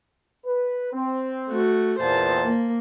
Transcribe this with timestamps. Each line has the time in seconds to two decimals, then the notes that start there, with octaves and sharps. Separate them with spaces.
0.45 B4
0.93 C4
1.50 A3 F#4
2.00 E2 A#2 C5 A5
2.45 A#3